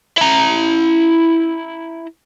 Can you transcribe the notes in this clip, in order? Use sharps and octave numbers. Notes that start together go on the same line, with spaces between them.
E4 A#5